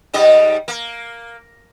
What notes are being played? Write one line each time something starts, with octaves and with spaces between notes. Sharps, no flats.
G#2 G3 D#5
A#3